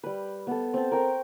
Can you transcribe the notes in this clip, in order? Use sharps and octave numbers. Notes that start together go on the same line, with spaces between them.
G3 B4
B3 A4
C4 A5
A#4 G5 A#5 C#6